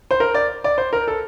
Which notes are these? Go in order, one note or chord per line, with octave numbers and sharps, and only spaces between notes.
C5
A#4
D5
D5
C5
A#4
A4